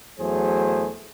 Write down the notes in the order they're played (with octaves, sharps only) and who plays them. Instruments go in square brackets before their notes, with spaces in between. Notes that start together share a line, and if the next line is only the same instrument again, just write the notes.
[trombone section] E2 F#3 A3 G#4 C5